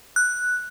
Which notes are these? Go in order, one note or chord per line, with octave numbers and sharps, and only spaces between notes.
F#6